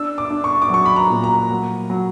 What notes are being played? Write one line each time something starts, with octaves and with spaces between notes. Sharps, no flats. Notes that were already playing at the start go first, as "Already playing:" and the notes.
Already playing: D4 E6
D6
D4
C#6
D6
F#3 C#6
B5
A#5
A#2
A#5
F#3
F#3